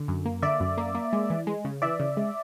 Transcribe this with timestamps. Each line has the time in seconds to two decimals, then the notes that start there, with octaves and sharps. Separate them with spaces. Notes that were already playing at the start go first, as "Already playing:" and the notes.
Already playing: D3
0.08 F#2
0.26 A#3
0.42 D3 D5 E5
0.60 F#2
0.78 A#3
0.95 A#3
1.13 G#3
1.30 E3
1.47 G#3
1.65 C#3
1.82 E3 D5 E5
2.00 C#3
2.17 G#3